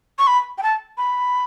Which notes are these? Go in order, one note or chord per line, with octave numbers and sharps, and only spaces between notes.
C#6
B5
G5
A5
B5